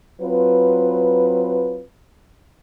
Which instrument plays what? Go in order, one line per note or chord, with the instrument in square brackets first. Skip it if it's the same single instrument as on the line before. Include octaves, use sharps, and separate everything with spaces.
[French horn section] F#3 C4 F4 B4